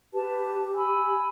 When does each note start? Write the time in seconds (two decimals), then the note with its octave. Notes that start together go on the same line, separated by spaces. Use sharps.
0.14 G4 B4 A5
0.74 G#5 B5 E6